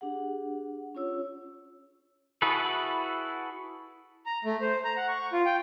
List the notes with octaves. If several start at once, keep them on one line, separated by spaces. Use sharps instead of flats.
D4 G4 G#4 F#5
C#4 F4 C#5 E6
E4 F#4 G#4 A4 B4
A#5
A3
C5
A#5
F#5
C#6
F4
G5